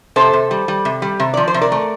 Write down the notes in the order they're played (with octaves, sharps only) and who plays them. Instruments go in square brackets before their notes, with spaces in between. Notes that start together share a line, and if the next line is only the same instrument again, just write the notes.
[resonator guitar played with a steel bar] C3 A4 C5
C3
G3
G3
C3
G3
C3
F3 D5
C5
C3
A#4 D5
A3